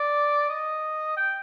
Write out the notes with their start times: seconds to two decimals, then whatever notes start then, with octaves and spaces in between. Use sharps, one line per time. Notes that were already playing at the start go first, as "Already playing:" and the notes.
Already playing: D5
0.49 D#5
1.17 G5